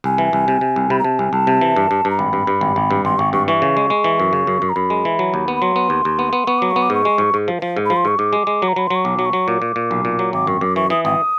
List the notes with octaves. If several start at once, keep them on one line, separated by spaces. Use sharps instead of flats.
C2 G#5
E3
C2
C3
C3
C2
C3 B5
A#5
C3 A5
C2 G#5
C2 A5
C3
E3
G2
G2
G2
A#5
G#1 B5
G2
G2
G#1
G#1
G2
G#1 C6
G#1 C#6
G2 C#6
E3 C#6
C#3
G#3
G#3
E3
F#2
C#3
F#2
F#2
A#5
F#2 B5
G#3
E3
F#3
D#2
B3
B5
F#3 C6
B3
D#2
D#2
B3
B3
B3 C#6
F#3 D6
C#6
B3
D6
G#2 C#6
G#3
G#2
G#2
F3
F3
G#2
F3 B5
C6
G#2 C#6
G#2 D6
G#3
G#3
F#3
A#5
F#3 B5
F#3 C6
C#6
B1 D6
F#3
C#6
F#3
A#2 D6
A#2
A#2
B1
A#2
F#3
G#1 D6
F#2 C#6
F#2 D6
E3 C#6
E3 D#6
G#1 D#6